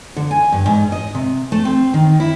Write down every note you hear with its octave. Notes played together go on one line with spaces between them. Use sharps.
D3
G#5
G2
G#2
D#5
C3
A3
C4
D#3
E4